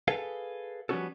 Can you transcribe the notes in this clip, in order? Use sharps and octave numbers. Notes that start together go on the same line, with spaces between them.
G#4 A4 B4 F5
F3 G3 B3 C#4 F#4 A4